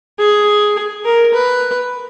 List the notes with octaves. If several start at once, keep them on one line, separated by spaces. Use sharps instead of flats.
G#4
A#4
B4